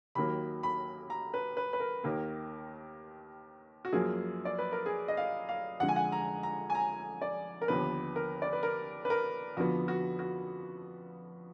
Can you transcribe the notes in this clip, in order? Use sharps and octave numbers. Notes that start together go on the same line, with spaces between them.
D#2 D#3 F#3 A#3 B5
B5
A#5
B4
B4
B4
A#4
D#2 D#3 A#3
F#4
F#2 F3 A#3 G#4
D5
B4
A#4
G#4
D#5
F5
F5
F2 D3 G#3 F#5
G#5
F#5
A#5
A#5
G#5
A#5
D5
A#4
D#2 D3 F3 B3 B4
A#4
D5
B4
A#4
B4
A#4
F2 D3 F3 B3 F#4
F#4
F#4